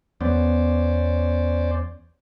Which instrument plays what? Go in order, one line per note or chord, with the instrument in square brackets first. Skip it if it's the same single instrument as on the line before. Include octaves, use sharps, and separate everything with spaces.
[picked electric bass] E2 B3 [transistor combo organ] C#4 C5 D5